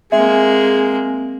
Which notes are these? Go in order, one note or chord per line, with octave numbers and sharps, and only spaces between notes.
G#3 A#3 C4 G#4 E5 G#5